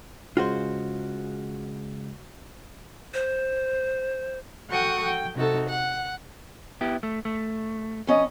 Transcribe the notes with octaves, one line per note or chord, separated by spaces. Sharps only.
C#3 G#3 F4 F#4 C5
C5
F#4 A4 F#5 G5 C#6 D#6
G5
C3 D#4 F#4 A4
F#5
B3 E4 G4
A3
A3
F2 C#4 D#5